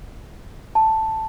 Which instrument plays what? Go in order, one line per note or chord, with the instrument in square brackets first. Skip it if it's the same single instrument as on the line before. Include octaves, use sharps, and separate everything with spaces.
[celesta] A5